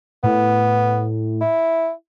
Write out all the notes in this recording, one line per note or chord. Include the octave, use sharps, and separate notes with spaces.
A2 B3
E4